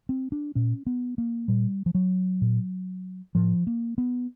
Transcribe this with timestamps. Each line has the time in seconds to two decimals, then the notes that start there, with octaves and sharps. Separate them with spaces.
0.09 C4
0.32 D4
0.55 A#2 C#4
0.87 B3
1.18 A#3
1.48 A#2 G3
1.86 F3
1.95 F#3
2.41 A#2
3.35 A2 F3
3.67 A#3
3.98 B3